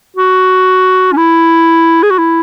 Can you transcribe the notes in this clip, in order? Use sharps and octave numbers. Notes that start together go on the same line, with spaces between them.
F#4
C#4
E4
G#4
F#4
E4